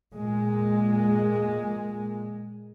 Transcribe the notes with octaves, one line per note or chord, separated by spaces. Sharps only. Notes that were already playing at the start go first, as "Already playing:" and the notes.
A#2 G#3